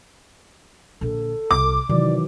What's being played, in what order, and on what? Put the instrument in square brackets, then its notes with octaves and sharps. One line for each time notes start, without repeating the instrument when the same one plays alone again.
[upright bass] A#1 D3 [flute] A4
[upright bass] C2 [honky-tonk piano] D6
[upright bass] C3 [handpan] D#3 E3 F#3 [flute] D5